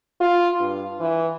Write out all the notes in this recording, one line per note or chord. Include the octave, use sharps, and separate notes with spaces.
F4
G2
E3